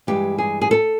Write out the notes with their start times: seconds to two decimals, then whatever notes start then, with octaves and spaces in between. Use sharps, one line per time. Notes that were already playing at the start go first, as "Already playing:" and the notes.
0.07 G2 E3 G#3 G4
0.38 G#4
0.62 G#4
0.71 A4